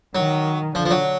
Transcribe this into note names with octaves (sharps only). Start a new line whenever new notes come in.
D#3 F#3
D3 F3
F3
F#3